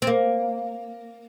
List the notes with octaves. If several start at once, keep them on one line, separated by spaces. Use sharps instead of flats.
C4
A#3